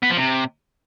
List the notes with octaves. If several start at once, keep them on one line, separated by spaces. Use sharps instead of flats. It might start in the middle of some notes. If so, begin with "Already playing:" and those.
B3
F3
C3